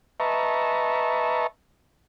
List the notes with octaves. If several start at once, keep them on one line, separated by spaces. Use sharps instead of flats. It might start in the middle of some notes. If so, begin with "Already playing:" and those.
B4 D#5 E5 A5 A#5 C#6